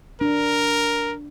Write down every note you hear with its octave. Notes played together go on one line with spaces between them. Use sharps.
D4 A#4